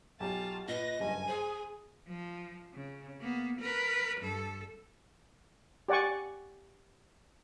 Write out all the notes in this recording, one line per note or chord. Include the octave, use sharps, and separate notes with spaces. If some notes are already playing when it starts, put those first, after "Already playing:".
B1 F4 G4 G#5 A5
A#2 B4 D#5 A#6
F#1 G2 G#5
G#4 C5
F3
C#3
A#3 B3
A#4 B4
G2 A4
G4 D5 F#5 G#5 C#6